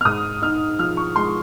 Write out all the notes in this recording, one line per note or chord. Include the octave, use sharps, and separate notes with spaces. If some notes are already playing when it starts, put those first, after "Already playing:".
F6
G#2 D#6
D#4 F6
F3 F6
C#6
G#3 C6